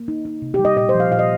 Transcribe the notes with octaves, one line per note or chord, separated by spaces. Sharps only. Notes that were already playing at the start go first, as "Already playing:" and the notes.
Already playing: A#3
D#4
D#4
C3
G4
G3
D#5
A#2 D#5
C5
F3
F5
A#2 F5
D#5